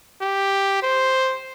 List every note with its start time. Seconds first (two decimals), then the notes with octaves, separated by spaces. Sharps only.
0.22 G4
0.83 C5